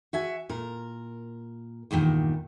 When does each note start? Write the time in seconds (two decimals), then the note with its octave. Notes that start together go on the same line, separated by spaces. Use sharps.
0.13 F#4 E5 G#5
0.49 A#2 A#4
1.91 E2 G2 A#2 D#3